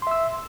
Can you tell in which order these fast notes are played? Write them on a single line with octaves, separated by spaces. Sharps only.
C6 E5 E6